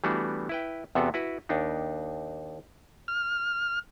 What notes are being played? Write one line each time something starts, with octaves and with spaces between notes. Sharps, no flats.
E3 G3 A3 B3 D4 F#4
E4 B4 G5
E2 C3 B3 F#4 A4
E4 F#4 B4
D#2 D4 D#4
F6